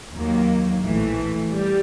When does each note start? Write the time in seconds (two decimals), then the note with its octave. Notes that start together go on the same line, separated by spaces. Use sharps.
0.13 D#2 D#3 F#3 A#3
0.83 A#1 A2 E3 A3
1.52 G3